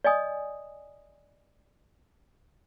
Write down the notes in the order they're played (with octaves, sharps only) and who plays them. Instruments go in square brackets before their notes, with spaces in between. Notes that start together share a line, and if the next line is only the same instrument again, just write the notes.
[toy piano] D5 D#5 G#5 D#6